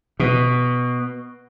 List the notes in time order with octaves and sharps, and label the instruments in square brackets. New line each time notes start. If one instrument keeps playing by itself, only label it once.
[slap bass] B2